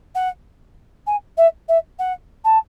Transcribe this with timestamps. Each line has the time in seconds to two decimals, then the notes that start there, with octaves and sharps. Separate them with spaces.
0.14 F#5
1.06 G#5
1.37 E5
1.68 E5
1.98 F#5
2.44 A5